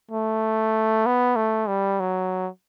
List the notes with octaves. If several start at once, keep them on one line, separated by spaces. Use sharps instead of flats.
A3
B3
A3
G3
F#3